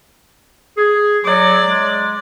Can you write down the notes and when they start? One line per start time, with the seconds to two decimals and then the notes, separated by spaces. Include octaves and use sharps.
0.77 G#4
1.25 F#3 D5
1.66 G#3